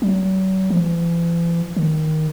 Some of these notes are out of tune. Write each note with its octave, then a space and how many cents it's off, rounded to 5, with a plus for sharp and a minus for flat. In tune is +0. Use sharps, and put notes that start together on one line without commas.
F#3 +40
E3 +45
D#3 +5